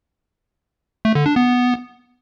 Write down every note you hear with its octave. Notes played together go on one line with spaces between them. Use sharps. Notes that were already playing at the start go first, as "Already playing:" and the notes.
A3
D3
D4
B3